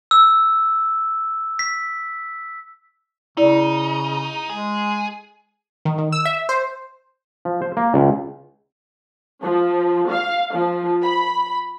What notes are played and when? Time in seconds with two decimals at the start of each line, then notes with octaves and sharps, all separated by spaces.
0.11 E6
1.59 B6
3.37 C#3 D#4 E4 D5
4.50 G#3 G#4
5.85 D#3
5.98 D#3
6.12 E6
6.25 E5
6.49 C5
7.45 F3
7.62 C5
7.77 A#3
7.94 C#2
9.42 F3
10.10 F5
10.55 F3
11.03 B5